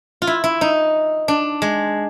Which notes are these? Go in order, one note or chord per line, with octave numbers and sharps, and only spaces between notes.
F4
E4
E4
D#4
D4
G#3